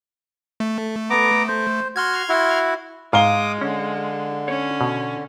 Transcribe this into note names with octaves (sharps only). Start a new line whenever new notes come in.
A3
B3 A#5 D6
C5
F#4 C6 F6 G#6
E4 F#4
G#2 G#3 F5 D6 D#6 G7
D3 C#4
C#4 C#5
B2